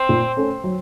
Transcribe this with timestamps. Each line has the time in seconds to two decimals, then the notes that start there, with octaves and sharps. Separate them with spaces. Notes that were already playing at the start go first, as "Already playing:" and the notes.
Already playing: C4
0.09 A#2
0.36 A3 C#4 A4
0.64 F#3